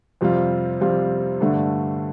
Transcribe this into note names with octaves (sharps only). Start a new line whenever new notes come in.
F2 C3 G3 C4 F4
F2 C3 G3 C4 F4
G2 D3 A3 D4